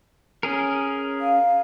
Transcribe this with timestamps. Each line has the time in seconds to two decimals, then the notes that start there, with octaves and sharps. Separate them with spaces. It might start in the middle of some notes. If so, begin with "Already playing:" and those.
0.43 C#4 G#4 A#4
1.21 F5